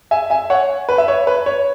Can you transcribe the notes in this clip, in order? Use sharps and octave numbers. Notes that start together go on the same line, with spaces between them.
E5 G#5
E5 G#5
C#5 F#5
B4
E5
C#5
B4
C#5